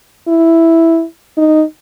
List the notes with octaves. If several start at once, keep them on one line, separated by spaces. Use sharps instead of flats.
E4
D#4